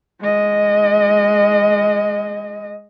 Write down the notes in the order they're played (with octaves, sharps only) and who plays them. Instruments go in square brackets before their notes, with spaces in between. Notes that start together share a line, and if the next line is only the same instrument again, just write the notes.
[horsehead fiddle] G#3 D#5